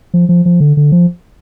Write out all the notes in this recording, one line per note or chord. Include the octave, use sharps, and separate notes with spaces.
F3
F3
F3
D3
D3
F3